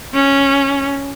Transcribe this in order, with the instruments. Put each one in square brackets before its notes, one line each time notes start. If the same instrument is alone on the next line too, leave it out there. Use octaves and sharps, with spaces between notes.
[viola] C#4